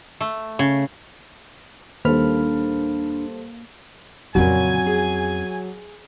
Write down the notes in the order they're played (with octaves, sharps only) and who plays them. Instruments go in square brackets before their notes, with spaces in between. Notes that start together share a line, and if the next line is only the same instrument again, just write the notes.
[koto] A3
C#3
[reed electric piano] D#2 B5 F6 [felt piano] G3 A4 C5 [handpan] A#3 [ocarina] D4
[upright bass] F2 C#4 [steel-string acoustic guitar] A#2 C#3 [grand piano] F#3 [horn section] G#5
[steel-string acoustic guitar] G#4